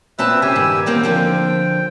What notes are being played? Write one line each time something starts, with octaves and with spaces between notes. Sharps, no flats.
A#2 C4 B4 E5 A5
C#3 G4 G#5 E6
G2 D#3
E2 A#3 C4 G5
D3 F3 C4